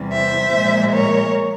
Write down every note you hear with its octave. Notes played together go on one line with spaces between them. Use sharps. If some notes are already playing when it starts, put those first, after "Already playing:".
Already playing: E2 C3 G3
C5 E5
A#2 F3 G#3
A#4 C#5